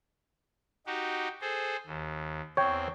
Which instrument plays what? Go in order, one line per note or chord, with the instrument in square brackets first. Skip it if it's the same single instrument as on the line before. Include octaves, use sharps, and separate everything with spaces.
[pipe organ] D#4 F#4 G4
G#4 A4 C5
D#2
[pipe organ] E2 C4 [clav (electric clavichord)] C#5 G5